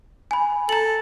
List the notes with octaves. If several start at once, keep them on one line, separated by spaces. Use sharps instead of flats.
G#5 B5
A4 A#5 F#7